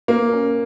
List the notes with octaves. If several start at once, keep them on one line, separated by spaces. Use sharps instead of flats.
A#3
C#4